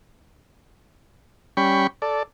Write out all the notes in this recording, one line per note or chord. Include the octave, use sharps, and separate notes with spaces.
G3 C#4 G5 B5 C#6
A4 D5